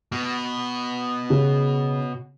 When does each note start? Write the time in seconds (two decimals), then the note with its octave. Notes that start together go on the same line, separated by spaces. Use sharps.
0.12 B2
1.30 C#3